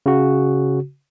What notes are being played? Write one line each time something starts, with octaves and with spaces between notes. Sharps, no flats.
C#3 F#4